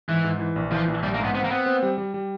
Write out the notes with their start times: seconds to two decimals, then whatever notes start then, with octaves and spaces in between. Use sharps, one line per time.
0.09 G#2 E3
0.24 G#2
0.40 E3
0.56 A#1
0.72 E3 F3
0.88 A#1
1.03 A#1 G3
1.14 A#3
1.19 G#2
1.24 B3
1.35 B3 C4
1.44 A#3
1.51 B3 C4
1.66 C4
1.83 G3
1.98 G3
2.14 G3